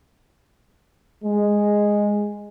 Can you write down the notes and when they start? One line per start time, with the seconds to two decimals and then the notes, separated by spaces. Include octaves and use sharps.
1.23 G#3